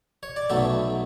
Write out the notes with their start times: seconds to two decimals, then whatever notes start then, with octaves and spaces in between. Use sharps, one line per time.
0.23 C#5
0.36 D5
0.50 B1 B2 F#3 A3 E5